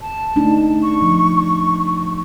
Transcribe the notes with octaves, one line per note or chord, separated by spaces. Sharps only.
A5
A3 D4 D#4
C#6
F3